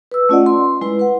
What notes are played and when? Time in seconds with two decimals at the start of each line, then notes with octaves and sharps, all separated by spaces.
0.12 B4 E6
0.29 A3 C#4 F4 D5 D#5 F#5
0.46 C6
0.81 G#3 E4 B4
0.99 B4 F#5